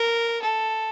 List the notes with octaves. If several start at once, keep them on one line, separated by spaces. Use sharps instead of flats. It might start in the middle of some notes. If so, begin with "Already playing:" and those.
Already playing: A#4
A4